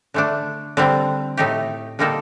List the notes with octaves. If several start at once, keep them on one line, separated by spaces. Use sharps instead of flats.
D3 A3 D4
D3 G3 C4
A2 A3 D#4 G4
D3 G3 A#3 D#4 A4